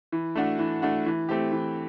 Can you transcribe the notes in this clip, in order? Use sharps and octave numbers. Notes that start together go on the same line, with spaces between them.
E3
A3 D4 F#4
E3
A3 D4 F#4
E3
A3 C4 G4
E3